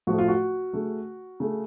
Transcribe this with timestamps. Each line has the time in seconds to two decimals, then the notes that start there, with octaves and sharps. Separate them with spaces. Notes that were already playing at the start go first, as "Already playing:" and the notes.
0.07 A2 F3 A3 F#4
0.18 F4
0.28 F#4
0.73 C#3 A3
1.40 C#3 A3